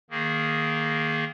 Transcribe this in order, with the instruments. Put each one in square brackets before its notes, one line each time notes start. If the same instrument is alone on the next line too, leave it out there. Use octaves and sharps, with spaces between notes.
[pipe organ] D#3 A#3 G#4